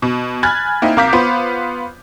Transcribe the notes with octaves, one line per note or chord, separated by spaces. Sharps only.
B2
G#5 B5 F6 F#6 G#6 A6
A#3 C4 D#4 E4
C2 A#4 F5 D6 G6 B6
B3 F4 B4 C5